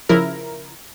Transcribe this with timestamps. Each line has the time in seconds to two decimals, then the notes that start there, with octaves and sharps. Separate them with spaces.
0.09 C#3 F3 E4 A#4